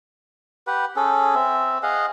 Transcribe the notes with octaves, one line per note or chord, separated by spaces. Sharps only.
G4 B4 F#5
C#4 G#4 A4
C4 E5
G#4 D#5 F5 F#5